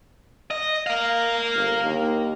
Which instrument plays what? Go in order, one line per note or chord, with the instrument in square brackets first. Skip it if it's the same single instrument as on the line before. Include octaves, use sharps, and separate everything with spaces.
[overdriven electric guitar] D#5
A#4 F5
[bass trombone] G1
D#2